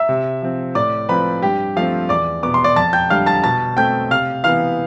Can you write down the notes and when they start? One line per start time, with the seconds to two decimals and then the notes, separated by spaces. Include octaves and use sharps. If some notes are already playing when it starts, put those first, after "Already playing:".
Already playing: E5 E6
0.09 C3
0.42 F3 C4
0.75 A2 D5 D6
1.09 F3 C4 B4 B5
1.42 G2 G4 G5
1.76 F3 A3 C4 F4 F5
2.09 E2 D5 D6
2.43 B2 B3 D6
2.54 C6
2.64 D5 D6
2.76 F2 A5 A6
2.93 G5 G6
3.10 D3 G3 F5 F6
3.26 A5 A6
3.43 B2 A5 A6
3.77 A3 C4 G5 G6
4.11 C3 F5 F6
4.44 E3 B3 F5 F6